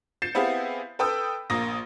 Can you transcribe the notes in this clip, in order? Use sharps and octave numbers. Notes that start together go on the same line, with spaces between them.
G6 A6 C7 C#7 E7
B3 C4 E4 G4 G#4 F5
A4 B4 G5 B5 D#6 E6
A#1 A#3 D#6 A#6